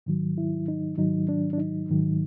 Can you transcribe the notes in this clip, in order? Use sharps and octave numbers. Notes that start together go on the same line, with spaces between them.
G#2 D#3 F#3
E4
D#4
G#2 D#3 F#3 D#4
D4
D4
D#4
G#2 D#3 F#3